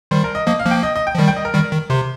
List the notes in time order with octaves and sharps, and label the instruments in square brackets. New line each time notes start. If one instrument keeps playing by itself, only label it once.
[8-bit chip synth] D#3 G3 [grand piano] C5
[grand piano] A#4
D#5
[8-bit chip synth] F3 A#3 [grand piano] D#5
[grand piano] F5
[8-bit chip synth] F3 A#3
[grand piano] G5
D#5
D#5
G5
[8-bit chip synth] F3
D#3 G3
[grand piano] G5
D#5
A#4
[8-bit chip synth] D#3 G3
D#3
[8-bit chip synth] C3 [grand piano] C5